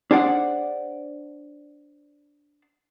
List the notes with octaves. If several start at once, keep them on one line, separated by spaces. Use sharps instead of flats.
D4 G#4 C5 D5 F#5